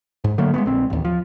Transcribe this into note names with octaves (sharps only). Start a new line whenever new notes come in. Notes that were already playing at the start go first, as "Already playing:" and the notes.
G#2
D3 F#3 A3 A#3
G#3 A3 B3
A#1 C4
A1 D#2
F3